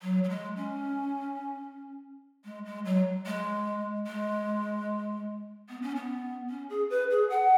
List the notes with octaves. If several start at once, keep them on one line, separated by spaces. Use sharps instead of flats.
F#3
F#3
G#3
C#4
G#3
G#3
F#3
G#3
G#3
B3
C#4
B3
C#4
G#4
B4
G#4
F#5